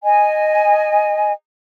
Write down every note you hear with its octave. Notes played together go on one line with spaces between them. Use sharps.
D#5 G#5